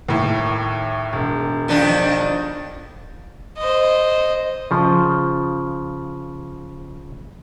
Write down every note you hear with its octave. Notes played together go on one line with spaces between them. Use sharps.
D#2 A2
E1
F2 D#3 D4
C5 D#5
C#3 F3